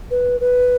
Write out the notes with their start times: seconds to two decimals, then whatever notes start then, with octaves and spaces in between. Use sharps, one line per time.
0.10 B4
0.40 B4